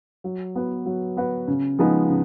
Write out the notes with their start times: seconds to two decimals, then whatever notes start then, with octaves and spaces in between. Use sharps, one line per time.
0.24 F#3
0.55 B3 F#4 B4
0.86 F#3
1.17 B3 F#4 B4
1.48 C#3
1.79 F3 G#3 B3 D#4
2.09 C#3